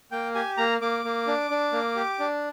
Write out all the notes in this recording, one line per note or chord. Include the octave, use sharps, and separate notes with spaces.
A#3 G5
G4 G#5
A#3 A#5
A#3 D6
A#3
D4
D4
A#3
G4
D4